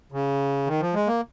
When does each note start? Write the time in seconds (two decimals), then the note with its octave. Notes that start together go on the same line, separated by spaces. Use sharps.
0.12 C#3
0.67 D#3
0.80 F3
0.94 G#3
1.07 A#3